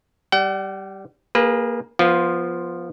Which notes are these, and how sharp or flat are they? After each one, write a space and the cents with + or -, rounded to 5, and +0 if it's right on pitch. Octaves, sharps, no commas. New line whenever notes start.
G3 -5 F#5 +45
A#3 +0 G#4 -25 B4 -25
F3 +0 B3 -20 F4 +0